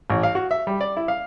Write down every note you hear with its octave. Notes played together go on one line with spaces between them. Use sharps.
A1
F5
F#4
E5
G3
D5
E4
F5